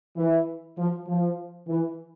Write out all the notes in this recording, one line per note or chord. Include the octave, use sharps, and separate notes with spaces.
E3
F3
F3
E3